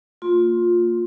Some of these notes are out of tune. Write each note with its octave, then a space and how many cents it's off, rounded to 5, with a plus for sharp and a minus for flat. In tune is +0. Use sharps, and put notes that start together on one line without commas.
A#3 -30 F4 +15 C6 +10